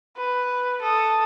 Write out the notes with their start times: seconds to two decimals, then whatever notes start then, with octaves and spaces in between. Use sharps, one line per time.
0.16 B4
0.81 A4 D#6